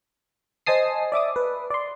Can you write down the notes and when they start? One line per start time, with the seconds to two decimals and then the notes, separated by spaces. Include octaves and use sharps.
0.66 C5 D#5 G#5 A5 D#6 C7
1.12 D5 E5 D6 D#6
1.36 B4
1.70 D5 C6